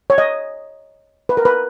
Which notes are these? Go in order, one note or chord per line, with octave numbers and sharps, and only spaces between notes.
C#5
D#5
B4
A#4
B4